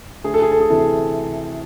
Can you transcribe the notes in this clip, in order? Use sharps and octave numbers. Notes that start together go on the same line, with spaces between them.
D2 G#4
A4
G#4
A4
G#4
C3 E3 A3 A4
G#4